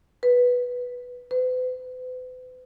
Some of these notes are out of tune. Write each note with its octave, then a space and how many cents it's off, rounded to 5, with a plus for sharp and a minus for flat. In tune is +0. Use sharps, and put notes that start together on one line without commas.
B4 -5
B4 +45